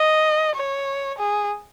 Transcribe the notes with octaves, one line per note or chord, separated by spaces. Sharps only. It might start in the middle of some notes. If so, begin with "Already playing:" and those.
Already playing: D#5
C#5
G#4